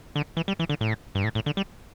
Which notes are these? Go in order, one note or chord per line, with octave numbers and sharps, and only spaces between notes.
D3
E3
G3
E3
D3
A2
G2
A2
A2
D3
G3